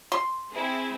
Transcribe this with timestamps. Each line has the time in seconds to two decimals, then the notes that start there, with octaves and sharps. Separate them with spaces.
0.12 C6
0.52 C4 E4 G#4